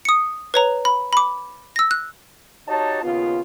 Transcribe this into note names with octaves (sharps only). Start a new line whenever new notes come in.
D#6 C#7
B4 C#5 A#5
B5
B5 D6
E6 A#6
F#6
D#4 F#4 G4 C#5 A5
D#2 C#3 B3 F4